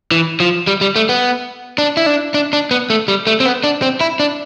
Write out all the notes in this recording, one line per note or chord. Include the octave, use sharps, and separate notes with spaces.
E3
F3
G3
G3
A3
B3
D4
E4
D4
D4
D4
B3
A3
G3
A3
C4
B3
D4
C4
E4
D4